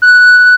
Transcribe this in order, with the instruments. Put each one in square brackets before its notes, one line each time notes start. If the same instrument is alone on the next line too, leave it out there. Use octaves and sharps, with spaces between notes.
[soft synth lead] F#6